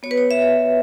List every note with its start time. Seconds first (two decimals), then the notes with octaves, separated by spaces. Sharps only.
0.03 B3 F#4 C#5
0.11 B4
0.18 C#5
0.31 E5
0.42 C#5